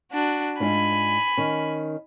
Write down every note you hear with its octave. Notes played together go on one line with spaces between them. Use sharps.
D4 F#4
G#2 D4 F4 G#5 B5
D#3 C#4